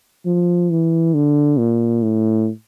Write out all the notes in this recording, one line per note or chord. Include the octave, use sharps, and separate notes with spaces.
F3
E3
D3
A#2
A2